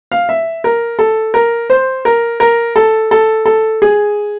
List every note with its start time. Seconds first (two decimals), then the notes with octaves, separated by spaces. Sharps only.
0.12 F5
0.29 E5
0.64 A#4
0.99 A4
1.34 A#4
1.70 C5
2.05 A#4
2.40 A#4
2.76 A4
3.11 A4
3.46 A4
3.82 G#4